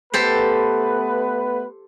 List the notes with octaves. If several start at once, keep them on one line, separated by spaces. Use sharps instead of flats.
A3 B3 G4 A4 B4 C5